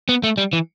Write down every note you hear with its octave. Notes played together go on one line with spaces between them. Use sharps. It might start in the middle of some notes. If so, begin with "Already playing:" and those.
B3
A3
G3
E3